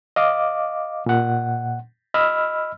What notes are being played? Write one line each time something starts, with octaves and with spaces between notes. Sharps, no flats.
D#5 F5 D6
A#2 F#5
D#5 B5 E6 F6